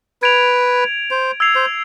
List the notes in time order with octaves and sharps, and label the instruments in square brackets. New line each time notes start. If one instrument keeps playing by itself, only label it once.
[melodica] B4 [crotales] G#6 D7 F7
[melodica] C5
[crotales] E6 G#6 C7 F7
[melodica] C5